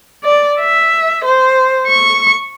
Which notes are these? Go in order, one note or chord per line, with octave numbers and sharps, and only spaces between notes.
D5
E5
C5
C#6